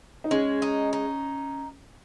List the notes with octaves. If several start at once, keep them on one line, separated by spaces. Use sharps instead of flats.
D#4
G#3 C#4
D#4
D#4